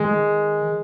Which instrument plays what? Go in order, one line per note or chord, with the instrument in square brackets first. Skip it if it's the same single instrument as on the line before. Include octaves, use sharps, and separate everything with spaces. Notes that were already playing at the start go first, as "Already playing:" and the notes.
Already playing: [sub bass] D#3 [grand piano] G#3